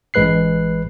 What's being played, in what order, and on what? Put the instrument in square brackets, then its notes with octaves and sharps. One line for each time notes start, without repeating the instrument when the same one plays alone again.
[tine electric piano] A1 G#3 B4 F#6 C7